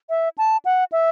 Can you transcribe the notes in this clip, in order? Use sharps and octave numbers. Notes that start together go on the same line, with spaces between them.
E5
A5
F#5
E5